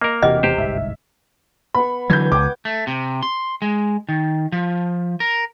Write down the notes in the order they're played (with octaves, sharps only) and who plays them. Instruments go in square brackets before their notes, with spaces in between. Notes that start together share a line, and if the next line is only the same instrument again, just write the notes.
[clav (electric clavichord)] A#3 A#4 [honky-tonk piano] D#5
[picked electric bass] E1 C3 E3 [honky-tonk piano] F#4 G4 F6 [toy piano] D#5
[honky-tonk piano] E2 [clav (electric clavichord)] G4 C5
[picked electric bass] G1 C2 G#2 [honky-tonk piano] E5
[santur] B3 C#6 [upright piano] B5
[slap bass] D3 E3 F#3 [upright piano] G6 G#6
[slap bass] C#2 [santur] F#5 G5 D#6 [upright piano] D6
[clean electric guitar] A3
C3
C6
G#3
D#3
F3
A#4